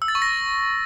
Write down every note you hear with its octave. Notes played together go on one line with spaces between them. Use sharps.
E6
A6
C#6
A#6